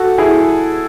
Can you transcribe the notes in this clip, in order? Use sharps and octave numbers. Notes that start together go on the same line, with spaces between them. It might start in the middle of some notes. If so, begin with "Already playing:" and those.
Already playing: F#4 A4
E4 G#4